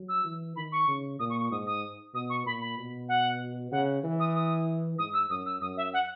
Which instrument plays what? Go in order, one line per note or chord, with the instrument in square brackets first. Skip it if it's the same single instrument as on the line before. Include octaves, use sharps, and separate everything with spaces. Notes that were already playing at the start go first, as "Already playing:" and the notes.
Already playing: [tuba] F#3
[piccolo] E6
[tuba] E3
[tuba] D#3 [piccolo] B5
[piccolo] C#6
[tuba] C#3
[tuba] A#2 [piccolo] D#6
[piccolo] C#6
C#6
[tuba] G#2 [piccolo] D#6
[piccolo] D#6
[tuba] B2 [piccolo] D#6
[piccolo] C#6
[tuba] A#2 [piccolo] B5
[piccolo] B5
[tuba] B2
[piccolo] F#5
[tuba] C#3 [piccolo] F#5
[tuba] E3
[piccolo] D#6
D#6
[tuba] G#2 [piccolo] D#6
[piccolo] E6
[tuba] F#2 [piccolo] D#6
[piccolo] E6
[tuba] F#2 [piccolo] D#6
[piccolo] E5
F#5